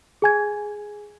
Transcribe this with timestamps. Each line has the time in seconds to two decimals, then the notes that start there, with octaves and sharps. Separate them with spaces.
0.22 G#4 G#5 G#6